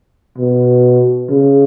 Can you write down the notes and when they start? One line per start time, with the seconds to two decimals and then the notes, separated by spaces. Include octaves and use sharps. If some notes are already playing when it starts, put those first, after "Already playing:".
0.38 B2
1.30 C#3